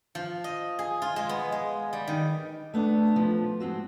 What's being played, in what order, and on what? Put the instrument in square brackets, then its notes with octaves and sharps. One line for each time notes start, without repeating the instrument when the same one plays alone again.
[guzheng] F3
D#5
G#4
F4
G#3
B3
G#3
G3
D#3
[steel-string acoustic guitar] A3 B3 D4
F3
G#2 C4 F#4